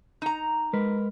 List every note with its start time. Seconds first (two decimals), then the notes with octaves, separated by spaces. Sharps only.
0.22 D#4 A#5
0.73 G#3 A#4 B4